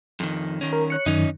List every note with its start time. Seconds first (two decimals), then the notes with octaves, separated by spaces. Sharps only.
0.20 F2 D#3
0.61 D#3 C#4
0.73 A#4
0.90 C#5 F#6 C#7
1.06 F#2 D#3 C#4 D#4